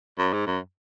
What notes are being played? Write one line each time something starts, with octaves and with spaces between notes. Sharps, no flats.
F#2
G#2
F#2